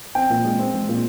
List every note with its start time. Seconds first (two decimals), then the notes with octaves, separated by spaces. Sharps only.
0.15 C4 G5
0.30 A#2
0.45 G#3
0.59 C4
0.74 G#3
0.88 A#2